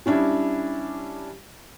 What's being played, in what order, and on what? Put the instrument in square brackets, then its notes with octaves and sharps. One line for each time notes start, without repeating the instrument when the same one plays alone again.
[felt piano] G3 C#4 D4 E4